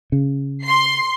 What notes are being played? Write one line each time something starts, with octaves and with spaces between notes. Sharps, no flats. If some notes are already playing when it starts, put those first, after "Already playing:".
C#3
C6 C7